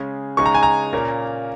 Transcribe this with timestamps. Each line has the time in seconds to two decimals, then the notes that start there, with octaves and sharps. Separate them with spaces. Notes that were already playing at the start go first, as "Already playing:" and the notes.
Already playing: C#3 G#3 C#4
0.37 C#3 G#3 D#4 C#6
0.46 A#5
0.55 G#5
0.63 A#5
0.93 A#2 A#3 C#4